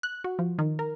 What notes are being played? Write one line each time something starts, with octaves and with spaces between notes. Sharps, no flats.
F#6
F#4
F3
D#3
A#4